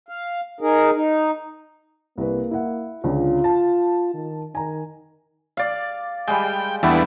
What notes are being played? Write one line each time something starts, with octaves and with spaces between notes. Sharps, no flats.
F5
D#4 G#4 A#4
D#4
C2 A#3 B4
E4 F#5
C#2 D3 C#4 F4
A5
D#3
D#3 G#5 A#5
D5 F5
G3 G#3 G5
E2 E3 G3 A3 B3 D4